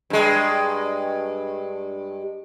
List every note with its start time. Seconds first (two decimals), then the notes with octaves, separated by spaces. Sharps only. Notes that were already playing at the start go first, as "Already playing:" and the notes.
0.10 G2 G#3